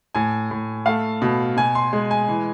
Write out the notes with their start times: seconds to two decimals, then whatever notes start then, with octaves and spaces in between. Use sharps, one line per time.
0.15 A2 G#5
0.51 A2
0.86 A3 F5
1.22 B2
1.57 B2 G#5
1.75 C6
1.93 G#3
2.11 G#5
2.28 E3